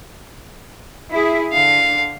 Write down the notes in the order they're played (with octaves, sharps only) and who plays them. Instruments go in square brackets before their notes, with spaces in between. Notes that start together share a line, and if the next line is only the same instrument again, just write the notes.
[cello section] E4 G#4
[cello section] D3 [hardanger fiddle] F5